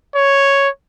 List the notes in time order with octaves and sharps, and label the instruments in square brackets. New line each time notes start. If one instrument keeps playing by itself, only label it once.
[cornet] C#5